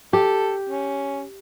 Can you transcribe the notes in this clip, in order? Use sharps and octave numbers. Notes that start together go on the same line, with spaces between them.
G4 A4
C#4